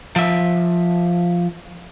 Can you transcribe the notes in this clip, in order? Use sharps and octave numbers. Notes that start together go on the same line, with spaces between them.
F3 E5